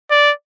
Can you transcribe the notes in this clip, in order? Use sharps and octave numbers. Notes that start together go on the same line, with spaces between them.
D5